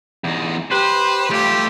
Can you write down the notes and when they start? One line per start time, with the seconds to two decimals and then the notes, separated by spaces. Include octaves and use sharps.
0.24 E2 D#4
0.71 G4 B4 C5
1.30 G3 A3 F4 G4